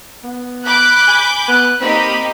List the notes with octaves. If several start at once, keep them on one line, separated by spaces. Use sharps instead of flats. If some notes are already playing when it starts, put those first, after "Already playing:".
B3
B5 D6 F#6 G6
G#5
B3 F#6
A#3 C4 D#4 G4 B5